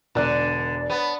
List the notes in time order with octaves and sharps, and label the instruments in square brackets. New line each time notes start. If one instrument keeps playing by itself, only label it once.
[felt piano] E1 F#6 [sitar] D3 [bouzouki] D#4 A#4 D5
[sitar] B3 [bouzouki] C#5 A5